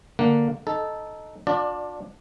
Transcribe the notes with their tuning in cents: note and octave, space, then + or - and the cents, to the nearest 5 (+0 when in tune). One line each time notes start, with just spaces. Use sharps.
D3 +0 A#3 +0 F#5 +0
D#4 +0 A4 -10
D4 +0 F4 +40 D5 +20